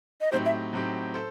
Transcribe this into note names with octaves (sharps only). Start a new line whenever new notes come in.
D#5
A2 F#3 C4 D#4 G4 C5
E5
A2 F#3 C4 D#4 G4
A4 C5